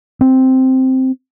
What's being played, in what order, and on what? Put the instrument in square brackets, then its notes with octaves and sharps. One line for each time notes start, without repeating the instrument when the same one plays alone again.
[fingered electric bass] C4